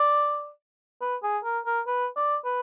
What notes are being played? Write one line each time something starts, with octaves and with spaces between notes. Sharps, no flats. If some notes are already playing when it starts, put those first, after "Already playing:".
Already playing: D5
B4
G#4
A#4
A#4
B4
D5
B4